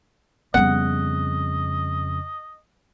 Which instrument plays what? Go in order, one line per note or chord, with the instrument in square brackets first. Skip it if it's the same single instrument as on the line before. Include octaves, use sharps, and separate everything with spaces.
[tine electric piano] F2 C#3 [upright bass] G3 B3 [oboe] D#5 [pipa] F#5